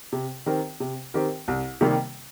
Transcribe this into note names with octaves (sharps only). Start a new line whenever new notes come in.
C3
D#3 C4 G4 A#4
C3
D#3 C4 G4 A#4
C2
C3 D#3 G3 A#3